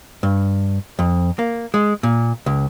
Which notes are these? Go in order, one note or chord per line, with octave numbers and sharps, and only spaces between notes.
G2
F2
A#3
G#3
A#2
C#2